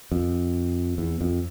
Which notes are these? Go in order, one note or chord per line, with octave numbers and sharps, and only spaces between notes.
F2
E2
F2